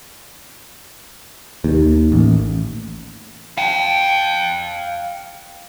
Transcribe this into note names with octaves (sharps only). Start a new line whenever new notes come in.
D#2
A1
F5 G5